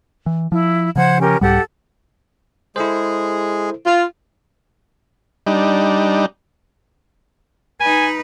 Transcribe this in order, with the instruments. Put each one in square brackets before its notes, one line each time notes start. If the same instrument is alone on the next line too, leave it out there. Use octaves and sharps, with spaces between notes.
[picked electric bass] E3
[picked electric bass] F3 [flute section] E4
[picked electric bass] C#3 F3 [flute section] C5 F#5 G#6
[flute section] C#4 G4 A#4
[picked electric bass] C2 G#2 G3 [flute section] G4 A4 F#5
[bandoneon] G#3 G#4 [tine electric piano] E4 A4 C5
[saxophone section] F4
[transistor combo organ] G3 D4 D#4
[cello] D#4 B4 [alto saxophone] G#5